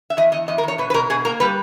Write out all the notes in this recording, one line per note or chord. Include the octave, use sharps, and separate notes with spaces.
E5
E2 D#5
E2 D#5
E2 D#5
A#4
E2 C#5
B2 B4
B4
B2 A#4
B2 G#4
A#3 A#4
G3 B4